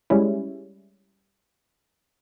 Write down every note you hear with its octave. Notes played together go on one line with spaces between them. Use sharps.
G3 G#3 C#4 E4